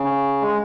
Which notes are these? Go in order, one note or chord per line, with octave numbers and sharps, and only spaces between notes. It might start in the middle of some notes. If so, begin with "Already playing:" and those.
Already playing: C#3
G#3